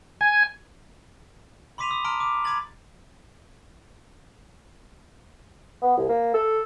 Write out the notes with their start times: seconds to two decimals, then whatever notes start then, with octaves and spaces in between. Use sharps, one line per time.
0.21 G#5
1.78 B5 C6 D6 B6 D#7 F7
1.89 B5 D#6
2.04 A5 A#5 C6 F6 D7
2.20 D6
2.44 B5 D6 G#6 A6 F#7
5.82 B3
5.97 C2
6.09 A#3
6.34 A4